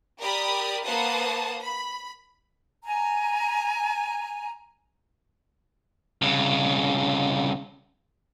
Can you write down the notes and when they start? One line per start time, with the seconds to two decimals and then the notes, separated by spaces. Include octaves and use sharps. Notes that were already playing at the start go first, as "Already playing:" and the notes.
0.20 G4 A#4 D5 B5 D#6
0.85 A#3 B4 C5 F#5 A5 D#6
1.62 B5
2.84 G#5 A#5
6.22 C2 C#3